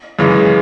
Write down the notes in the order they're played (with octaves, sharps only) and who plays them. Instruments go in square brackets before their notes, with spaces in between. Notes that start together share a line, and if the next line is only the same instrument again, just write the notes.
[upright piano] F#2 C#3 E3 G#3 C#4